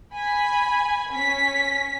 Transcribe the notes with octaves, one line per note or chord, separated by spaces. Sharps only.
G#5 B5
C#4 B6